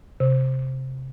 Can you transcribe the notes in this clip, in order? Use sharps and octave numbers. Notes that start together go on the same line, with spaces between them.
C3